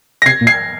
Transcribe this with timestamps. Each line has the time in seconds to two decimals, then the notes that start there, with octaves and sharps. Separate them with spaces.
0.22 A#6
0.26 C3 G#6 C7
0.41 A#2
0.47 G#6 C7